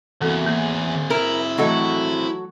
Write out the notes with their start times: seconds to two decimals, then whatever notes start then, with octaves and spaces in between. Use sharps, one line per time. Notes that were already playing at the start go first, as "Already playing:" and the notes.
0.22 E2 A#3 C4 F#4 A4
0.46 A#3 C4 G#4
1.10 E4 A#4
1.58 E3 F#3 A3 F#4 A4 D#5